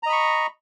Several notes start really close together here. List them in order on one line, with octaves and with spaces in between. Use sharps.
A#5 D#5 B5 C#6